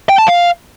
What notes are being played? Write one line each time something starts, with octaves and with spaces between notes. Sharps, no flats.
G5
A5
F5